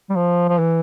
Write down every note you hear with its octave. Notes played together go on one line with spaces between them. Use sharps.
G3
F3
F3
E3